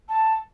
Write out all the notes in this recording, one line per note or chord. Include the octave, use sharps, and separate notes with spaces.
A5